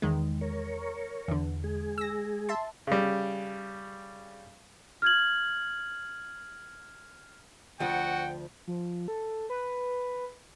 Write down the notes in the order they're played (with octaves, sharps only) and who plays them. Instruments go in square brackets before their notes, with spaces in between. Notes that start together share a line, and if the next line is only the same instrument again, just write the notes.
[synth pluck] E2 D#3 G#3
[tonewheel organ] A#4 C#5
[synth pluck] E2 D3
[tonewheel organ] G#3 G#4
[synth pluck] E6 A#6
E5 A5 C6
[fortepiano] C#3 G3
[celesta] F6 G#6 F#7
[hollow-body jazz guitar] D2 F3 [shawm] F#4 [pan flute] F#5 [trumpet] G5
[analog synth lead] F3
A4
B4